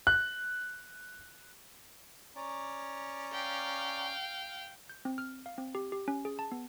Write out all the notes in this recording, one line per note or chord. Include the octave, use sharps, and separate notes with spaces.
F#6
C#4 D5 A#5
F5 G5
G6
C4
F6
F5
C4
G4
G4
C#4
G#4
A5
B3